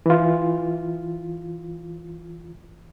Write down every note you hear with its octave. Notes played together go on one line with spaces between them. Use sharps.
E3 F4